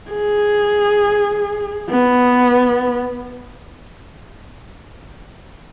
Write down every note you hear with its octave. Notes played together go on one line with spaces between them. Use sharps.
G#4
B3